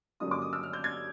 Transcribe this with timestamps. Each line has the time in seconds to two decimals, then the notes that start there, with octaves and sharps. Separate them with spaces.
0.20 G2 D3 F#3 A#3 C#4 D#6
0.31 D6
0.42 D#6
0.53 E6
0.63 F6
0.73 G6
0.84 G#6